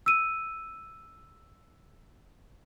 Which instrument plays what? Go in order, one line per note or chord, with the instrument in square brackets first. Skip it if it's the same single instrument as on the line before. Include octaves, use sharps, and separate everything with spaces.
[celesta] E6 D#7